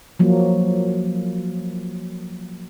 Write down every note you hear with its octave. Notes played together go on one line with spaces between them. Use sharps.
F3 F#3 A#3